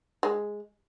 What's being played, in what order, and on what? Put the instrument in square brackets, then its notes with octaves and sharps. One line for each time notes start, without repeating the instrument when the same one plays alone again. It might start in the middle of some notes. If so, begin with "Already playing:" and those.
[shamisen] G#3